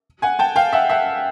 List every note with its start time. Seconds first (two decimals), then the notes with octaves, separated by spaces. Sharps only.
0.22 F#5 G#5
0.39 G5 A5
0.56 F5 G5
0.72 E5 F#5
0.89 E5 F#5